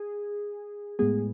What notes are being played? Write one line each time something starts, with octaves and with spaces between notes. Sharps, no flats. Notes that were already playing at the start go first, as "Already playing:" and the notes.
Already playing: G#4
A2 G#3 B3 G#4